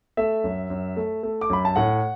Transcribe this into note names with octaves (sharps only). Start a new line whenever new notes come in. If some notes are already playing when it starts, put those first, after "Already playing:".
A3 E5
F#2
F#2
A3
A3
D6
F#2 B5
A5
A2 F#5